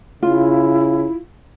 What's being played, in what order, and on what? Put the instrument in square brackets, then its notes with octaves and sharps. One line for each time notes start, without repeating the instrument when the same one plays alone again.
[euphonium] C#3 [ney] E4 [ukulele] F4